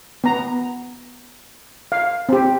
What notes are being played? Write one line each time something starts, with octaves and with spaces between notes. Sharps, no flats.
B3 A#5
F5
C4 G4